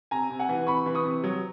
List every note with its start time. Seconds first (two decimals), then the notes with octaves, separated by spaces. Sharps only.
0.11 C3 G#5 A#5
0.30 C3
0.39 F#5 G#5
0.49 E3
0.67 C3 B5 C#6
0.86 E3
0.95 C#6 D#6
1.05 C3
1.24 F#3